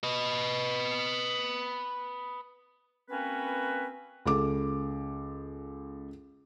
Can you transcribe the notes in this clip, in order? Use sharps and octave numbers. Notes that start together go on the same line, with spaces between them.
B4 D#5
A#3 C4 C#4 F#4 B4
C#2 A4 D6